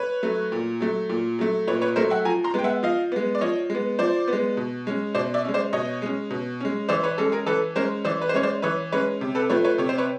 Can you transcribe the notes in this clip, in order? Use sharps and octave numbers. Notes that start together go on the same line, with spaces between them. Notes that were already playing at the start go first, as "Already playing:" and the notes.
Already playing: B4 C#5
F#3 A3
A#2
F#3 A3
A#2
F#3 A3
A#2 B4 C#5
B4 C#5
F#3 A3 A#4 C5
E5 F#5
F3 G#5 A#5
A#5 C6
G#3 B3 G5
E5 F#5
F3 D#5 F5
G#3 B3
D5
F3 C#5 D#5
G#3 B3
F3 C5 D5
B3
G#3
B2
G#3 C#4
B2 C5 D5
D5 E5
G#3 C#4
C5 D5
B2 C#5 D#5
G#3 C#4
B2
G#3 C#4
E3 C5 D5
B4 C#5
G#3 C#4 A4
G#4 A#4
E3 A4 B4
G#3 C#4 A#4 C5
E3 C5 D5
B4
C5
G#3 C#4 C#5
C5 D5
E3 B4 C#5
G#3 C#4 B4 C#5
C3
A4 B4
F3 A3 B4 C#5
B4 C#5
C3 C#5
C5
B4 C#5